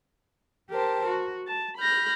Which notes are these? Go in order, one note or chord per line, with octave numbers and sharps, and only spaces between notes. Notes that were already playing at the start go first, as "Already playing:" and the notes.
G4 A#4 C5 A5
F#4
A5
B5 F6 G6 A#6